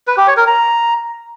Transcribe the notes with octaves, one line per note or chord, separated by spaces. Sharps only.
B4
G4
C#5
A#4
A#5